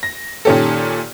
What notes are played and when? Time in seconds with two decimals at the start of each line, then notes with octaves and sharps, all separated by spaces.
0.03 A#6
0.45 A#2 D#3 C#4 G4 A4